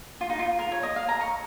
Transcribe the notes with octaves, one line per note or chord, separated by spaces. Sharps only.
F4
D#4
F4
A#4
C#5
D#5
F5
A#5
C#6